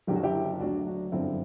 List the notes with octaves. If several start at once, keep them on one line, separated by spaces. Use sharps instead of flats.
F#1 F#2 D3 F#3 G4
F#4
E4 G4
D2 D3 F#3 D4 F#4
D4 F#4
G1 F#2 D3 C4 E4